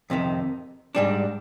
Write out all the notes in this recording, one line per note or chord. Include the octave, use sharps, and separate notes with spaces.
F2 C3 D#3
G#2 G3 D4